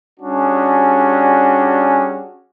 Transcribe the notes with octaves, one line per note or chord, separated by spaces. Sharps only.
G3 C#4 D4 F#4 G#4